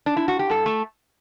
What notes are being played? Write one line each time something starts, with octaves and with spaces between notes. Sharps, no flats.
D4
E4
F#4
G4
G2 A4
A3